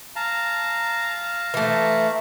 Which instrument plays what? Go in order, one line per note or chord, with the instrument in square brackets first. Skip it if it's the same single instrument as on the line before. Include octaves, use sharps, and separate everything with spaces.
[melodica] F5 A5 A#5
[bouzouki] E3 A3